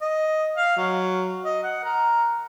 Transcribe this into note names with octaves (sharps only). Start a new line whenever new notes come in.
D#5
F5
F#3
D#5
F#5
A#4